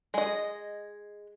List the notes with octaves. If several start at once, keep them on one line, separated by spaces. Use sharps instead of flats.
G#3 D#5